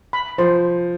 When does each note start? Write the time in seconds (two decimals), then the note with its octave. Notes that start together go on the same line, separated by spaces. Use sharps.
0.13 B5
0.38 F3 C5